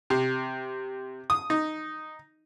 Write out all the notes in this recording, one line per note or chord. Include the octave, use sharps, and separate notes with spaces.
C3
D#6
D#4